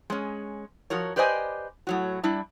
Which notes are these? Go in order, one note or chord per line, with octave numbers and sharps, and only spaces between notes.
G#3 C#4
F3 F#4 A#4 C#5
G4 B4 C5 D5 D#5 G#5
A2 F#3 F#4
G3 D4 E4